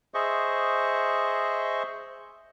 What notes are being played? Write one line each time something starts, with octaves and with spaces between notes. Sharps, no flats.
G#4 C5 D#5 E5 C#6